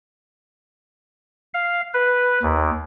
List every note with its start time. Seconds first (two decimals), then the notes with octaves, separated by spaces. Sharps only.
1.54 F5
1.94 B4
2.42 D#2